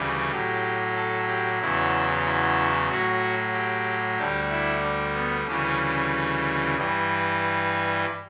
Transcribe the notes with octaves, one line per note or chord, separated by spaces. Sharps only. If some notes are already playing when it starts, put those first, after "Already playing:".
Already playing: D2 C#3 E3 G3
A2 F#3 G4
A4
G4
E2 C#3 F#3 E4
E4
A2 F#3 F#4
G4
D2 D3 G3 G4
E4
D4
B3
D2 C#3 E3 G3 C#4
G2 E3 G3